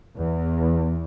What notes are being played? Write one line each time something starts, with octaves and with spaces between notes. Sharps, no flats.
E2